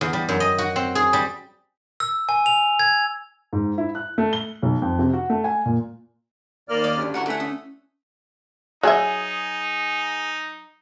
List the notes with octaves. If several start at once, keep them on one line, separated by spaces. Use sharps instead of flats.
E2
G3
F#2
D#5
F#4
C4
G#4
G3
E6
G#5
F7
G#6
G#2
E4
F#6
A3
G7
B1
F2
C3
F#4
A3
G#5
A#2
D#2 A#3 D5 F6
D6 D#6
D2 G2 C#4
D3 E3 F#4 A#4 F#5
A3 F#5 G#5
C#4 D#6
F#3 D#4 G#4 E5